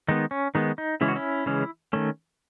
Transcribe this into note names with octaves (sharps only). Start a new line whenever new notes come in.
D#3 G#3 B3 D#4
C#4
D#3 G#3 B3 D#4
D#4
C#3 E3 G#3 C#4 E4
F#4
C#4 E4
C#3 E3 G#3 C#4
D#3 A3 C#4